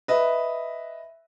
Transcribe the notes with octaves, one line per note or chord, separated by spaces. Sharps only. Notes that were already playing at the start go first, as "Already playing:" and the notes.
B4 D#5 E5